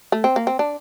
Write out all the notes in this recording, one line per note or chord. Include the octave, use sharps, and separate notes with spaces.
A3
C4
A#3
C4
D4